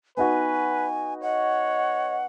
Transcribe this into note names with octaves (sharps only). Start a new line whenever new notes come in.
B3 D#4 F#4 B4 G#5
C#5 D#5 F#5